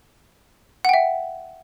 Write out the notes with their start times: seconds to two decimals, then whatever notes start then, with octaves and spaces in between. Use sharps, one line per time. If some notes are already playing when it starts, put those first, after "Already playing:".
0.85 F#5
0.89 G5
0.94 E5